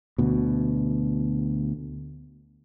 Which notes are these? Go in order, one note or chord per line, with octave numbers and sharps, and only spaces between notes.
D2 B2